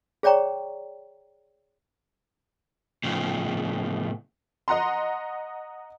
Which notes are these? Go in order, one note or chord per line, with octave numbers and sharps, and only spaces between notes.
G#4 C#5 D5 G5 A#5 C#6
A2 C#3 F3
D#5 F#5 A#5 C6